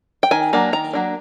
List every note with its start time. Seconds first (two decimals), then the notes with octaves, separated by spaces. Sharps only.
0.23 G5
0.31 D#3 G#5
0.53 F#3 A#3 D4
0.73 D#3 A#5
0.93 F#3 A#3 D4